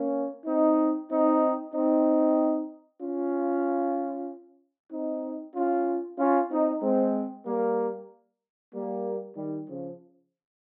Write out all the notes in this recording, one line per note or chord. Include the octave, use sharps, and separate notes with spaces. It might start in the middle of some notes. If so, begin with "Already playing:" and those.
Already playing: A#3 C#4
C4 D#4
C4 D#4
C4 D#4
C#4 F4
C4 D#4
C#4 F4
C#4 F4
C4 D#4
G#3 C4
G3 A#3
G3 A#3
D#3 G3
C#3 F3